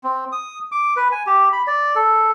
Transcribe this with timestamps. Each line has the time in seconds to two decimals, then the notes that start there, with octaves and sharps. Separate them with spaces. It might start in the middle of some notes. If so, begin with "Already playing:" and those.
0.04 C4
0.32 D#6
0.72 D6
0.97 B4
1.12 G#5
1.27 G4
1.52 B5
1.67 D5
1.95 A4